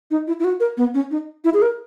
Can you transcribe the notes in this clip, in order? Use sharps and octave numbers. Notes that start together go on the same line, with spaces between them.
D#4
E4
E4
F#4
A#4
B3
C#4
D#4
E4
G#4
A#4